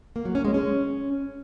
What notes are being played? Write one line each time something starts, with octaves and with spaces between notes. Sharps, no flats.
A#3
F#3
C#4
G#3
C#4